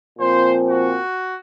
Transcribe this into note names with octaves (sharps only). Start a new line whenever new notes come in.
A#2 F3 C4 C5
F#4